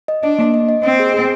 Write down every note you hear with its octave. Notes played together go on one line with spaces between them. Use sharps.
D#5
D4 D#5
A#3
D#5
D#5
C4 D#5
G#4
G#4